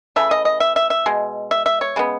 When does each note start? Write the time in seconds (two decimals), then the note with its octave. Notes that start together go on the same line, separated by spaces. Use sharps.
0.16 C#3 E3 A3 E5
0.31 D#5
0.45 D#5
0.60 E5
0.76 E5
0.90 E5
1.06 B2 G#3
1.51 E5
1.66 E5
1.81 C#5
1.96 C#3 G#3 B3